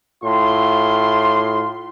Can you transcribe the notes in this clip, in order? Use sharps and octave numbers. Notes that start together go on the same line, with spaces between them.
A2 F4 C6